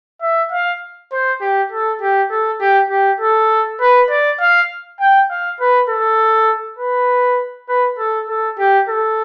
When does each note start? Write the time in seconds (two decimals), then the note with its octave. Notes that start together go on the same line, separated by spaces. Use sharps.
0.22 E5
0.52 F5
1.12 C5
1.41 G4
1.72 A4
2.01 G4
2.31 A4
2.61 G4
2.90 G4
3.21 A4
3.81 B4
4.10 D5
4.40 F5
5.00 G5
5.30 F5
5.60 B4
5.89 A4
6.79 B4
7.69 B4
7.98 A4
8.29 A4
8.58 G4
8.88 A4